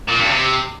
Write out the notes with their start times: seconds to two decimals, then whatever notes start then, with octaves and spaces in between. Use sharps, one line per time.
0.09 A#2
0.20 G2
0.30 C3